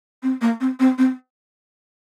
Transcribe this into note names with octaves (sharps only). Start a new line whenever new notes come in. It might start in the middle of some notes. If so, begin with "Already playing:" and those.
C4
A#3
C4
C4
C4